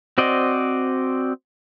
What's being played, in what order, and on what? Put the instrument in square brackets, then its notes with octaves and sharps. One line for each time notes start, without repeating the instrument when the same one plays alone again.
[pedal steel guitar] C4 F#4 C5 D5 D#5